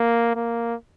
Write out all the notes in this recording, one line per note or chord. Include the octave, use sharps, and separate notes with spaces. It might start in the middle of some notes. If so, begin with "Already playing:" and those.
Already playing: A#3
A#3